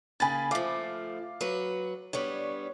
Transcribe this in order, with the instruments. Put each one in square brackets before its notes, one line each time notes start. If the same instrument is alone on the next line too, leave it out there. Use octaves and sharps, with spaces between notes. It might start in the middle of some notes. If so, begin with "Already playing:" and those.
[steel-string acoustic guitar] C#3 A#3 [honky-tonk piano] G#5 B5 A6
[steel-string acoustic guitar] F3 A3 [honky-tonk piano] F5 D6
[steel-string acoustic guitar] F#3 F#4 B4
[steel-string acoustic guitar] G3 B3 D4 [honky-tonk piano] C#5